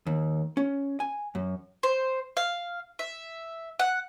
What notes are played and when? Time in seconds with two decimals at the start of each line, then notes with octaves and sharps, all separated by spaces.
0.07 D#2
0.57 C#4
1.00 G#5
1.35 F#2
1.83 C5
2.37 F5
2.99 E5
3.79 F#5